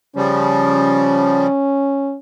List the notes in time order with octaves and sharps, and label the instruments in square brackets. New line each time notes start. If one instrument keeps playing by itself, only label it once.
[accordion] C#3 F3 G3 [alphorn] C#4